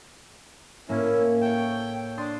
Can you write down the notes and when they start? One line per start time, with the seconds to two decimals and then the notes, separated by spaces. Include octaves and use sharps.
0.89 A2 A#3 C#4 E4
1.41 A4 C#5 G5
2.18 D4 C6 D#6 A6